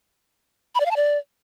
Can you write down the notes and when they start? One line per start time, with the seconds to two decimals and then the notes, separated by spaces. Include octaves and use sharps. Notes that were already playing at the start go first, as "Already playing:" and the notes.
0.75 B5
0.80 D5
0.86 F5
0.91 A5
0.96 D5